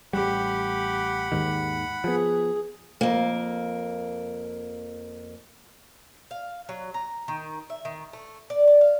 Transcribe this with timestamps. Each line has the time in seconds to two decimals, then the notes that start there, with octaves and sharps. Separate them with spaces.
0.13 A1 G3 G4 F#5 B5
1.32 D#2 G#2 D#3
2.04 F3 B3 G#4
3.01 F2 A#3
6.31 F5
6.69 F#3
6.94 A#5
7.28 D#3
7.70 E5
7.85 D#3
8.13 A3
8.50 D5
8.67 D5
8.81 F5